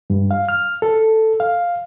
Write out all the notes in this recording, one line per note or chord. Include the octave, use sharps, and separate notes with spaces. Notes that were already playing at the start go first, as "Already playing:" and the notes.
G2
F5
F6
A4
F5